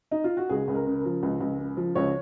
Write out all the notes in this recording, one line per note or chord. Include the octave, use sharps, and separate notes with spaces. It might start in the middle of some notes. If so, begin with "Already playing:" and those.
D#4
F4
F#4
C#2 G#4
C#2
A#4
C#3
A#4
F3
C#2
C#2
C#3
F3
C#2 C#5